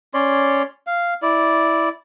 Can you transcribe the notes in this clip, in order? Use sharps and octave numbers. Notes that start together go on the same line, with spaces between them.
C#4 C#5 D5 C6
F5
E4 D5